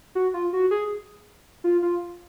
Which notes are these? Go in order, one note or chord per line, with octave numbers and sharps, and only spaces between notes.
F#4
F4
F#4
G#4
F4
F4